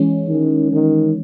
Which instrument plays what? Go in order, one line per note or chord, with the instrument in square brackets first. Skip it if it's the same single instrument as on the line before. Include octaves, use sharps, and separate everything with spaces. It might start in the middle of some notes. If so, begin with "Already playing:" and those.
Already playing: [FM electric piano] E3 G#3 C#4
[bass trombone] D#3
D#3